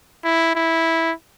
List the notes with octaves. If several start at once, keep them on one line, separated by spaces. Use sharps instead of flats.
E4
E4